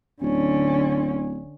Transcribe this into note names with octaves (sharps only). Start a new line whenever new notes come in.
D1 D3 C#4